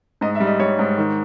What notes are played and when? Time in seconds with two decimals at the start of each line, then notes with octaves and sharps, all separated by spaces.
0.21 G#2 D#5
0.35 E5
0.40 G3
0.47 D#5
0.60 G3 C#5
0.79 G#2
0.98 D#3